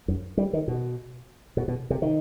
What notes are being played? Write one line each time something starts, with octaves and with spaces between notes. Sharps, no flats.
F#2
G3
D#3
B2
B2
B2
C3
D#3